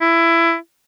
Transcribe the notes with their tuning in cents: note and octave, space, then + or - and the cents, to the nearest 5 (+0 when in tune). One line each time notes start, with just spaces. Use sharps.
E4 +20